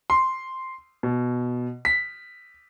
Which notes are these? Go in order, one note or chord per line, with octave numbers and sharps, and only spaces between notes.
C6
B2
B6